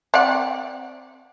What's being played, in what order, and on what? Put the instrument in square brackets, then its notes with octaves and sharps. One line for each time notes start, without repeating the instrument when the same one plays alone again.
[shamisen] C4 D5 F#5